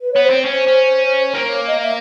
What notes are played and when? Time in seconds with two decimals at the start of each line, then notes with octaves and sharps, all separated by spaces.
0.01 B4
0.12 B3 C#5
0.23 C5
0.30 C4
0.45 C#4 C5
0.67 C#4
1.34 A#3 C5
1.46 C#5
1.67 D#5
1.79 E5